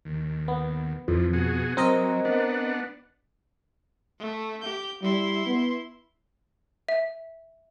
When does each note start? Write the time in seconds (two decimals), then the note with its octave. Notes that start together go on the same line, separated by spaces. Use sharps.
0.05 D#2
0.48 B3
1.08 F2 E3 F3
1.33 B2 F#4 G#4
1.77 F#3 C4 A#4 D#5
2.25 B3 D4 F#5
4.19 A3
4.61 G4 G6
5.02 G3 E4 C6
5.46 B3
6.89 E5